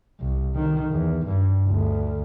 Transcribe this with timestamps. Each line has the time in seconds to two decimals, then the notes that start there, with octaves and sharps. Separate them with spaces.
0.20 C2
0.55 D#3
0.92 E2
1.26 G2
1.68 D2